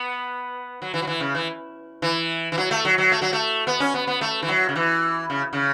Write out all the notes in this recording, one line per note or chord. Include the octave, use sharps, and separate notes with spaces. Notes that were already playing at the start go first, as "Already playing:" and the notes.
Already playing: B3
F#3
E3
F#3
E3
C#3
E3
E3
E3
F#3
A3
F#3
F#3
A3
F#3
A3
B3
C#4
B3
B3
A3
E3
F#3
C#3
E3
C#3
C#3